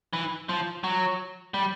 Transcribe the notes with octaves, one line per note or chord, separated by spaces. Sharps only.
E3
F3
F#3
G3